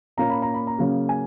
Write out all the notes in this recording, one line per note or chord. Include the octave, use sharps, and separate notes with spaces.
A#2 A#3 C#4 A#5
B5
A#5
B5
A#5
C#3 F#3 A#3 C#4
G#5